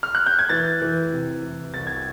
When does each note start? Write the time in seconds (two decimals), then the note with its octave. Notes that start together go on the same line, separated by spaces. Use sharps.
0.03 F6
0.15 F#6
0.26 G6
0.39 G#6
0.49 E3 A6
0.82 E3
1.12 C3
1.42 E3
1.74 C2 A6
1.87 G#6